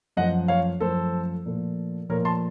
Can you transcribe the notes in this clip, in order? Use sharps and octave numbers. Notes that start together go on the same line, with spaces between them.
F#2 F3 A3 D#5 F#5
C#5 F5
F#2 F3 A3 A4 C5
A#2 F3 A3
A#2 F3 A3 A#4 C#5
A5 C6